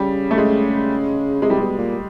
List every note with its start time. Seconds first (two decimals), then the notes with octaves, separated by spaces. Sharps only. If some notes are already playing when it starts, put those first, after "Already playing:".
Already playing: C#3 G3
0.31 A3
0.38 G#3
1.42 C3 G#3
1.50 G3
1.58 B2 G#3
1.78 A#2